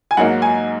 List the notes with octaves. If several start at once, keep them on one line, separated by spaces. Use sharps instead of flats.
G#5
G#2 F#3 A#3 D#4 F#5
G#5